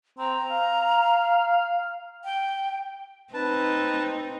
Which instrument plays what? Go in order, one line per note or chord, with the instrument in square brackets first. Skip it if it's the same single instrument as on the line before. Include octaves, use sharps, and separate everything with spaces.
[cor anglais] C4 [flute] A#5
[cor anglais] F5
[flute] G5
[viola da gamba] C4 D#4 [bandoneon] B4 A5